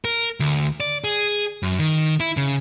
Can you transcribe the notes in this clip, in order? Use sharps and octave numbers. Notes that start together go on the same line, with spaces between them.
A#4
D2
D5
G#4
F#2
D#3
E4
C#3